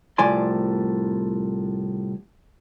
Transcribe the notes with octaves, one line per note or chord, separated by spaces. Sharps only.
C2 A2 F3 D5 G#5 C6